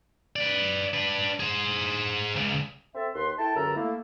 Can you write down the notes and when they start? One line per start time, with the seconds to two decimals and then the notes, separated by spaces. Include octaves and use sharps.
0.36 B4 D5
0.93 D4 B4
1.40 G#4 C5
2.36 C#2 C#3
2.95 C4 A4 E5
3.14 D#2 B4 C6
3.39 E4 A4 G5 A5
3.55 C#2 F#2 D3 A4 A#4 A#5
3.75 A3 A#3 E4